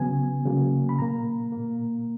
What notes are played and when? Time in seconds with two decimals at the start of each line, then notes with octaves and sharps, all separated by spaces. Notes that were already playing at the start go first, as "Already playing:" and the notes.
Already playing: C#3 F#3 B3 G#5
0.46 C#3 F#3 A#3
0.89 B5
0.99 A#2 A#3 A#5
1.52 A#2 A#3